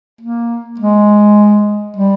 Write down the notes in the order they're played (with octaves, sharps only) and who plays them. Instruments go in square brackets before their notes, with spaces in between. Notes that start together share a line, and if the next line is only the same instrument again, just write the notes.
[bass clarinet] A#3
G#3
G3